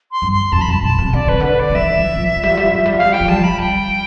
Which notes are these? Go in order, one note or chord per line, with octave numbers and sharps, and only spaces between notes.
C6
G2
C6
F2 A5
B5
G2 A5
B2 A5
C3
D3 D5
C3 B4
D3 B4
D5
F3
E3 E5
F3
F3
F3
G3
F3
G3
F3
G3
F3
G3
F3
G3 F5
F3
G3 G5
F3
G3 A5
F3
B5
G3 G5